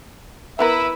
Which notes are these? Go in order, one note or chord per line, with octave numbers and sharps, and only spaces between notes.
E3 B3 E4 A#4 B4 E5